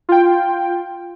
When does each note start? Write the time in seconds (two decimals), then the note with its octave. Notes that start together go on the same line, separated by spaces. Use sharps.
0.09 F4 G5